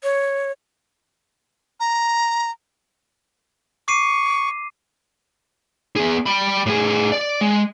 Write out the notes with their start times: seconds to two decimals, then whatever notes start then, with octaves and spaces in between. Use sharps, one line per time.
0.03 C#5
1.80 A#5
3.88 C#6 D6 C7 D#7
5.96 B3 G#4
6.26 G3 B5
6.66 A2 G#4
7.12 D5
7.41 G#3